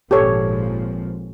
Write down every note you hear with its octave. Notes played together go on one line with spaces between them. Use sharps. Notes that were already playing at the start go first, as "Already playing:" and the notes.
G#1 A#2 F3 G4 A4 C#5